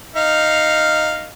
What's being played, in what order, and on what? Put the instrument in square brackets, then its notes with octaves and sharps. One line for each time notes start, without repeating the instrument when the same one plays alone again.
[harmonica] D#4 F5